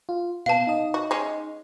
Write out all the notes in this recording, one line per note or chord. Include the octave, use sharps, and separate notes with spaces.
F4
B2 B3 F5 A5
D#4 D#5
F#4
G#3 C#4